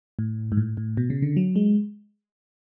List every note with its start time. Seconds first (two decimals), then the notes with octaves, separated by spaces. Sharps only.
0.19 A2
0.52 G#2
0.57 A2
0.77 A2
0.97 B2
1.10 C#3
1.22 D3
1.37 F#3
1.56 G#3